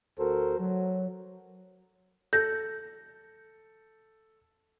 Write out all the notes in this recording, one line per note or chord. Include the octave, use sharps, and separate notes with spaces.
D2 F#4 A4 A#4 C5
F#3
A4 G6 A#6